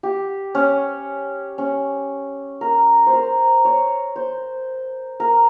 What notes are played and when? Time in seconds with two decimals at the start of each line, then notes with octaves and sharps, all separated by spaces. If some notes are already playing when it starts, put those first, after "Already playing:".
0.03 G4
0.55 C#4
1.58 C#4
2.61 A#4
3.07 C5
3.13 A#4
3.65 C#5
4.16 C5
5.20 A#4